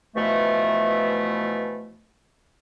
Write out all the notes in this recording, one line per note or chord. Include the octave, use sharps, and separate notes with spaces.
B2 E3 F3 A3